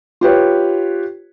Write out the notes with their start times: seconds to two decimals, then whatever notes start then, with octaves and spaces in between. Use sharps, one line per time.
0.21 F4 G4 B4 C#5